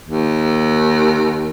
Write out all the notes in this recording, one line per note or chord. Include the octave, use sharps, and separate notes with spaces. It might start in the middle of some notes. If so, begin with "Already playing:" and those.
D#2